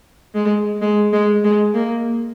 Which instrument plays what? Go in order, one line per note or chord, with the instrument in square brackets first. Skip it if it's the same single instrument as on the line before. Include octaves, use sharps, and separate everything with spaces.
[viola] G#3
G#3
G#3
G#3
A#3